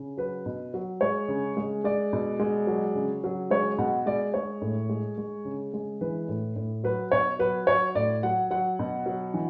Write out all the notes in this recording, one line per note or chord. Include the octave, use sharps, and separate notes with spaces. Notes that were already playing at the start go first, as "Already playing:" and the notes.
Already playing: C#3
F#3 B4
B2
F#3
G#3 C#5
C#3
G#3
G#3 D5
B2
G#3
F#3
C#3
F#3
G#3 C#5
B2 F#5
G#3 D5
G#3 C#5
A2
G#3
G#3
C#3
G#3
E3 B4
A2
A2
F#3 B4
B2 C#5
F#3 B4
F#3 C#5
A2 D5
F#3 F#5
F#3 F#5
B2
F#3
E3